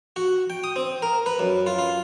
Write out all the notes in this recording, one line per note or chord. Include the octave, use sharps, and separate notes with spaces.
F#4
G5
D#6
C4
A#4
B4
F#2
F4
F4